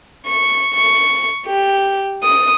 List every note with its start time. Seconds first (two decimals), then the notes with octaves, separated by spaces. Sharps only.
0.25 C#6
0.74 C#6
1.45 G4
2.22 D#6